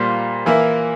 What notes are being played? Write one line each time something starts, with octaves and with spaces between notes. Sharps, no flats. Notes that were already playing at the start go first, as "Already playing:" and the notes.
Already playing: A#2 G3 A#3 F4 C5
E3 A#3 E4